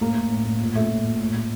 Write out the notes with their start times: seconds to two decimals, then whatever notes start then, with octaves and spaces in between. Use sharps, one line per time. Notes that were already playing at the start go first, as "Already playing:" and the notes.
0.01 A2 A#3
0.16 A2
0.30 A2
0.45 A2
0.60 A#2
0.75 A#2 A3
0.90 A#2
1.05 A#2
1.19 A2
1.35 A2